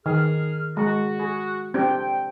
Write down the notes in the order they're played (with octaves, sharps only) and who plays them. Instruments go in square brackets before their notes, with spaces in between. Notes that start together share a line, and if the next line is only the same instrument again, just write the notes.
[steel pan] D#3 [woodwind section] G#4 F6
[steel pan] G#3 [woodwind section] F#4
[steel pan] G#4
[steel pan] C4 D4 G4 [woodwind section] G5